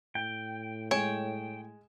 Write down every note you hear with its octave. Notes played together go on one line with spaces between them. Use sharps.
A2 G5
G#3 C#5 G5 G#5 E7